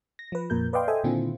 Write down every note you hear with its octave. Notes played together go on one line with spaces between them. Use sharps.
A#6
F3 B4
F2 A#2 A#4 G6
B4 D5 D#5 F5 G5 C6
A4 C5 D#5 E5 G5 G#5
A#2 D3 D#3 C4 E4 F4